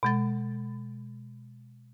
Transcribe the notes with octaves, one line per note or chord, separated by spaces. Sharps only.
B2 G#3 A6